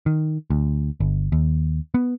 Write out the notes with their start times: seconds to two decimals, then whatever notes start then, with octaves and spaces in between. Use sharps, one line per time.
0.06 D#3
0.50 D2
1.00 G1
1.32 D#2
1.94 B3